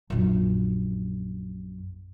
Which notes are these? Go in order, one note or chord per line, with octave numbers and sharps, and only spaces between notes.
A#1 F#2